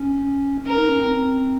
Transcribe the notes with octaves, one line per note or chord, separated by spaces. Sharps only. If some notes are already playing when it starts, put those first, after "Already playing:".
Already playing: C#4
C#4 A#4
D#4
C#4
C4